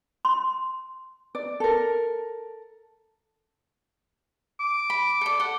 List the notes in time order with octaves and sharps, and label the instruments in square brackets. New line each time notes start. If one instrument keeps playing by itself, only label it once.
[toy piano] C6
[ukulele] D5
A4 A#4
[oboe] D6
[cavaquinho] B5
A4 D5
A4 F#5